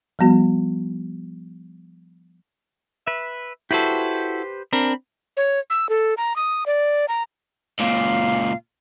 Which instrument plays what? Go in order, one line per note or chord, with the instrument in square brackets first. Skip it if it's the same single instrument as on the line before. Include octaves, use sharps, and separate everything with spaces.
[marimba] F3 G3 B3 F#4
[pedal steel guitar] B4 E5
[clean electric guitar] E4 F#4 A4 [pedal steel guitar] G4 B4 C5
[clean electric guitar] C4 D4 A#4 [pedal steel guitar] B5
[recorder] C#5
E6
A4
A#5
D#6
D5
A#5
[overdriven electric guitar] C#2 A#2 [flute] F5